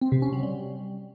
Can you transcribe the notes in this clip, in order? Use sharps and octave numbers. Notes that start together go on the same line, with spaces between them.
C4
C3
C#4
F#3
G3